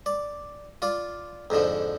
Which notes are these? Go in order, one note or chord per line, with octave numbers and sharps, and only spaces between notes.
D5
F4 D5
F2 G#2 D3 F3